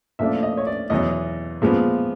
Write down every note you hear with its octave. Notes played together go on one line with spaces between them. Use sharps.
A#2 F3 A3 D4 E5
D#5
C#5
D5
E2 B2 F#3 D#5
A#2 F3 G#3 B3